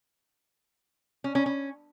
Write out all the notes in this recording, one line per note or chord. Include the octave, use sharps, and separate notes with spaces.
C#4
C#4
C#4